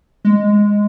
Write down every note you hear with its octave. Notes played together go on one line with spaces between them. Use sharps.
G#3